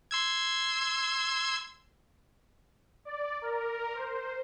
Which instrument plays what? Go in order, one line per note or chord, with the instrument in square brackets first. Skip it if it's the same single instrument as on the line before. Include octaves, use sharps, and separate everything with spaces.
[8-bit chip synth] C6 E6 G#6
[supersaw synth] D5
A#4
C5